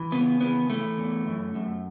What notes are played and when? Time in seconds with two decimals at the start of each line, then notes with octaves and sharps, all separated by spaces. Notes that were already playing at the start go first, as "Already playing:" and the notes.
Already playing: E3
0.12 C#3 B3
0.41 E3 B3
0.69 E3 A3
0.98 E2
1.27 F#2
1.55 F#2